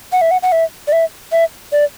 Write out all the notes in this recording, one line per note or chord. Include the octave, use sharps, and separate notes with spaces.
F#5
E5
F#5
F#5
E5
D5
E5
E5
D5